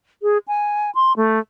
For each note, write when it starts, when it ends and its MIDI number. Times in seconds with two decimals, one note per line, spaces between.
0.22 0.38 68
0.48 0.91 80
0.95 1.13 84
1.17 1.39 57